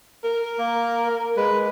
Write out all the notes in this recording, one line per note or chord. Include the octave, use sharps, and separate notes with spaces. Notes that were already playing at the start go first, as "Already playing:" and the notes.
A#4
A#3
G#3 B4